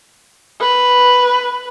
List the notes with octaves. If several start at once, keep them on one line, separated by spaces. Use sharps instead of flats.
B4